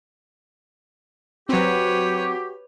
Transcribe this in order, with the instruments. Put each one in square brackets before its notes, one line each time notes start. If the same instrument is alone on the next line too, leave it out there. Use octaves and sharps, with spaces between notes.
[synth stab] F#3 C4 [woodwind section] F#4 G4 [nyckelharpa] B4 C#5